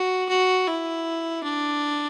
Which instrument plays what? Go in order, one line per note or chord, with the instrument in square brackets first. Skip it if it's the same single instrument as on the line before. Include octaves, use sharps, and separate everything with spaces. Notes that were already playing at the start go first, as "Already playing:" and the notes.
Already playing: [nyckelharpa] F#4
F#4
E4
D4